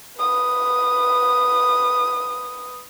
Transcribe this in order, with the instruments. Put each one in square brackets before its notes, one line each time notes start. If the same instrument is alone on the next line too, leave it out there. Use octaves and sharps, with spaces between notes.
[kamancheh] B4 D#6